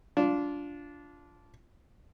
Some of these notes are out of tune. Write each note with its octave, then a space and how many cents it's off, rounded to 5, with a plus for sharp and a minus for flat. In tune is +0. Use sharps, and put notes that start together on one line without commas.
D4 -20 F4 +0